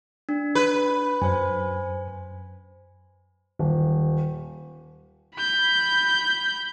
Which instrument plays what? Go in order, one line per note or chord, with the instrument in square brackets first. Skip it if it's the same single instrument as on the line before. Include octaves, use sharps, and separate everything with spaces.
[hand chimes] D4
[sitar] B4
[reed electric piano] F#2 [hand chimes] C5 G#5
[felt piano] D#1
[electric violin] B5 G6